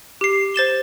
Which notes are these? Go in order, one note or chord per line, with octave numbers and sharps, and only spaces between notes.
G4 C7
C5 A6 E7 G7